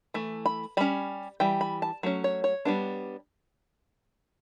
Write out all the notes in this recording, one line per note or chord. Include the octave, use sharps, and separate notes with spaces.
E3 A3
B5
G3 C#4 B5
E3 G3 G5
B5
A5
F#3 A3 C#4
C#5
C#5
G3 B3 D4